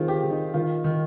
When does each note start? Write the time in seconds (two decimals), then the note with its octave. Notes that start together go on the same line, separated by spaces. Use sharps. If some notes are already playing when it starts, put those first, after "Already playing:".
Already playing: D#3 G#3 C4 D#4 F4
0.08 G4
0.23 D#3
0.31 D#4
0.54 D#3 F4
0.84 D#3